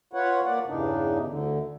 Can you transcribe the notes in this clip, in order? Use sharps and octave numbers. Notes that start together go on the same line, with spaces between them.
F4 B4 C#5 F#5
A#3 D5 F#5
E2 G2 C#3 E3 D4 D#4
D2 D3